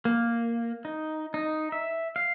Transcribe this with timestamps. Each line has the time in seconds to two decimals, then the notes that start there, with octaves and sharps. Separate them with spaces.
0.05 A#3
0.85 D#4
1.34 D#4
1.72 E5
2.16 F5